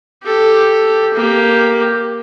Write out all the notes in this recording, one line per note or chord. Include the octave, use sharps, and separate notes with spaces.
G4 A4
A#3 G4